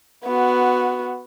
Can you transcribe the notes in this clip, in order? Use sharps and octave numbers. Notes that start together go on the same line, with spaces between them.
B3 F#4